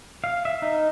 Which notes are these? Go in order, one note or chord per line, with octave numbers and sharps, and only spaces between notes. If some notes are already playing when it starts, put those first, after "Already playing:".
F5
E5
D#4